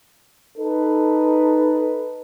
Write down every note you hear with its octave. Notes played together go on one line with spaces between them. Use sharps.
D#4 A4 B4